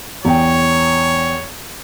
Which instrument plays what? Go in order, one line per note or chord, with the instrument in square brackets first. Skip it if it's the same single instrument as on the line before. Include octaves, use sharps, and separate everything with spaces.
[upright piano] E2 G5 [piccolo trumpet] C#5